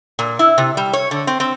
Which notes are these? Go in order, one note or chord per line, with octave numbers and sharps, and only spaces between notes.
A#2
E4
C3
G3
C#5
D3
C4
C4